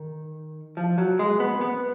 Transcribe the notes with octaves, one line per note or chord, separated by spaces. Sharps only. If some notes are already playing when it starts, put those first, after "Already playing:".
Already playing: D#3
F3
F#3
G#3
B3
B3